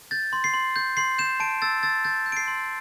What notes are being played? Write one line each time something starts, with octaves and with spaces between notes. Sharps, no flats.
G6 A6
C6
C7
C6
G6
C6 C7
G6 E7
A5 D7
E6 A6
E6 A6
G6 A6
G6
D7
C7
C6